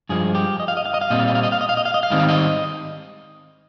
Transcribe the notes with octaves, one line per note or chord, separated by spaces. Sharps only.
G2 F3 G#3 G#4
G4
D#5
F5
D#5
F5
D#5
F5
A#2 G3 C4 D#5
F5
D#5
F5
D#5
F5
D#5
F5
D#5
F5
D#5
F5
G#2 D#3 G3 C4 D#5
F5
D#5